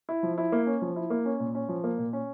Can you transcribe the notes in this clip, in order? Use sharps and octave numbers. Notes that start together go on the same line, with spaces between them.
E4
F3
E4
A#3
C#4
F3
E4
A#3
C#4
A#2
C#4
F3
A#3
A#2
C#4